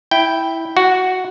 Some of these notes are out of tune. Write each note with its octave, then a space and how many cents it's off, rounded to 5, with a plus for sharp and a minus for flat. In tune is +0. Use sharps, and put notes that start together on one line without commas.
E4 -5 G5 +0
F#4 +0 F#5 -10